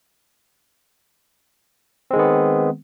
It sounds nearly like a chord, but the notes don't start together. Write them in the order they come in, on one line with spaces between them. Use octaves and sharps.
C4 G#3 D#3 B3